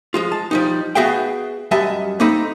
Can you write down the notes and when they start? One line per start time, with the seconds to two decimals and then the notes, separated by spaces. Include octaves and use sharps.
0.14 F3 G#3 F4
0.32 A5
0.51 F3 G3 D#4
0.95 B3 F#4 G#4 E5 F5 G5
1.71 F#2 G3 D#5 E5 A5
2.20 A#3 C4 D#4 A4 B5